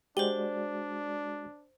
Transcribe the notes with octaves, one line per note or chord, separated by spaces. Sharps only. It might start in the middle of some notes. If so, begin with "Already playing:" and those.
G#3 D4 F#4 G4 C5 D5 F#7 G7